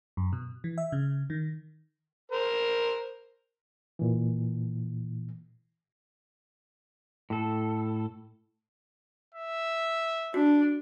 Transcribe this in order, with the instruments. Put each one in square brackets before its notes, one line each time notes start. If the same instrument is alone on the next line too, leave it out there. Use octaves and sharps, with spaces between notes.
[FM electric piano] F#2
B2
E3
E5
C#3
D#3
[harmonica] A#4 C5
[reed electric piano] A#2 E3
[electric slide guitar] A2 A4
[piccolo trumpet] E5
[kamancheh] D4 [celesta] F#4